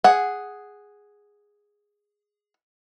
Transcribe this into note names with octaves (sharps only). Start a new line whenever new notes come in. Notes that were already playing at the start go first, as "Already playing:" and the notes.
G#4 F#5